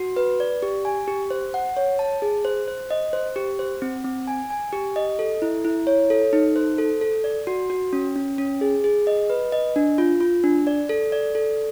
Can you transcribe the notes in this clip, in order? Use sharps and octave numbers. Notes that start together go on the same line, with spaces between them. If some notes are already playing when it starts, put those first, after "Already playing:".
Already playing: F#4
B4
D5
G4
G#5
G4
C5
F#5
C#5
A5
G#4
C5
C5
D#5
C5
G4
C5
C4
C4
G#5
G#5
G4
D#5
A4
E4
E4
C#5
A4
D#4
C5
A4
A4
D5
F#4
F#4
C#4
C#4
C#4
G#4
G#4
D#5
B4
D#5
D4
F4
F4
D4
D5
A4
D5
A4